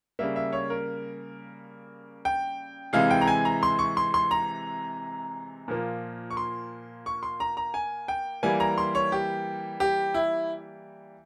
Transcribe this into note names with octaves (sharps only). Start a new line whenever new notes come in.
C#3 G3 A#3 E5
E5
C#5
A#4
G5
C3 E3 G#3 F5
G5
A#5
G#5
A#5
C6
C#6
C6
C6
A#5
A#2 F3 A#3
C#6
C6
C#6
C6
A#5
A#5
G#5
G5
E3 G3 A#3 G#5
A#5
C6
C#5
G4
G4
E4